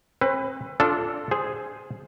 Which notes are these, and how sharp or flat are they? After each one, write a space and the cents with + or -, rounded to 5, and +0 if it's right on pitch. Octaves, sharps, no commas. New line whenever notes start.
C4 +40 B4 +15
D4 -10 F4 +0 A4 +0
G#4 +0 C5 +0